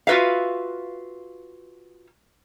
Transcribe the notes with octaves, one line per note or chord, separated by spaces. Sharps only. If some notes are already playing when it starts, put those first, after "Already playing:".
F4 F#4 B4 E5 F5